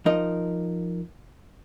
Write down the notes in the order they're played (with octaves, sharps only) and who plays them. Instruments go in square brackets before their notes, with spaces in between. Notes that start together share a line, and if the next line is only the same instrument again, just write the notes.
[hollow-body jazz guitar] F3 D#4 A#4 D#5